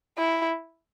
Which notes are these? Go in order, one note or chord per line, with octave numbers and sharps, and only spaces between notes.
E4